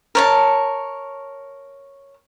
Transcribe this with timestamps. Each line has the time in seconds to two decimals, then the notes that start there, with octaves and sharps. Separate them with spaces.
0.15 A#4 C#5 A5